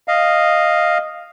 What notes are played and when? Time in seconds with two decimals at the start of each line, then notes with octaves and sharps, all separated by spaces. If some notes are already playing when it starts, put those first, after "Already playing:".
0.08 D#5 F5